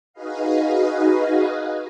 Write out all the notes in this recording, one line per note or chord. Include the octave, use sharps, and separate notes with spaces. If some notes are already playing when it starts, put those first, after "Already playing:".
D#4 F#4 G#4 B4 D#5 F5